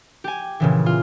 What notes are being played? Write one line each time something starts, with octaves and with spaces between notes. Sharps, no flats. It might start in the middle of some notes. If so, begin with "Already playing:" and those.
G4 G#5
A#2 C#3 E3
F4